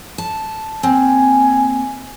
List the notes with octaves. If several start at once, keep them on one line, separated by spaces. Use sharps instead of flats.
A5
A#3 C4 G#5